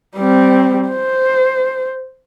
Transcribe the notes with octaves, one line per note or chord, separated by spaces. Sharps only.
G3 C4
C5